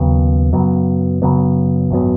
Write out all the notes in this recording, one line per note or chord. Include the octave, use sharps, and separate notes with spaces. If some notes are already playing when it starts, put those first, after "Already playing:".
Already playing: D#2 C#3 F#3 B3
F#2 C#3 F#3 B3
F#2 C#3 F#3 B3
G#1 F#2 F#3 B3